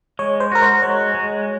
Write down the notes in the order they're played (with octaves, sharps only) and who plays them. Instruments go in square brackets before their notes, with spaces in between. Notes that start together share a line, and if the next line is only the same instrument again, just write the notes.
[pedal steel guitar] G#3 [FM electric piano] C#5
[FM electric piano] C5
[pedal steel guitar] F#4 [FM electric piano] A#4
[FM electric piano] C5
[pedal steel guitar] G#3 [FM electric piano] C#5
[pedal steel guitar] G#3